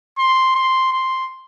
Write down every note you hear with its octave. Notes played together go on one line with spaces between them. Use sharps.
C6
C6
C6